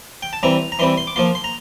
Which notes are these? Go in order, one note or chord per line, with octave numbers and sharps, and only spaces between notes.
G5
A5
E3 G3 C4 E4 A#5
A#5
E3 G3 C4 E4 C6
C6
D6
F3 A#3 F4 C6
C6
A#5